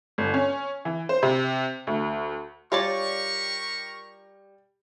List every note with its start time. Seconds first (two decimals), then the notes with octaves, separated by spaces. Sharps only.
0.18 G1
0.34 C#4
0.85 E3
1.09 C5
1.23 C3
1.87 D2
2.72 G3 F4 G4 A#4 C#5 D5 C#6